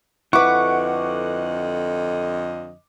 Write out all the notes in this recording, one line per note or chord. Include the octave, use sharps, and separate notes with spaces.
F2 D3 E4 B4 D#5 F#5 C#6 D6